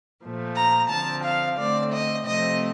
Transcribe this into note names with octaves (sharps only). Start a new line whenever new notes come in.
A#2 F3 A3
A#5
D3 F3 C4 A5
F5
D3 A3 C4 D5
D#5
C3 F3 A3 C4 D#5